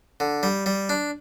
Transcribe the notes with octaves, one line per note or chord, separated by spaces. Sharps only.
D3
G3
G3
D4